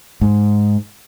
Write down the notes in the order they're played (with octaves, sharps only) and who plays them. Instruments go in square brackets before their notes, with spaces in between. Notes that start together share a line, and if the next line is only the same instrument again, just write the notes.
[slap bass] G#2